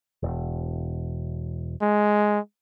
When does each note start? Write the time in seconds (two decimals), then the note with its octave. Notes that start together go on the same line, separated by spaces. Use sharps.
0.23 E1
1.82 G#3